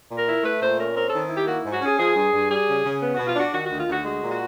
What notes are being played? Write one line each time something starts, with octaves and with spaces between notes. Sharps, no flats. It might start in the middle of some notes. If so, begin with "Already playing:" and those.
A#2
A#4
E4
A3 B4
A#2 C5
C#4 A#4
C4 A#4
D#3 A4
E4
G4
A#3 F#4
G#2
F#4
C#4 G#4
F3 G#4
G2
G2
G3 G#4
C#3
C#3
B3
B2 F#4
F4
D4 F#4
D#3 F#4
D2 F#4
F4
D2 F#4
G#3 F#4
A#2
F#4